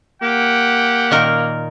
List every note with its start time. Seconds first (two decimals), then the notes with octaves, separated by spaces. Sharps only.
0.22 A#3 G4 F#5
1.11 A#2 D#3 A#4